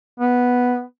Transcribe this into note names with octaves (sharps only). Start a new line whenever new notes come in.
B3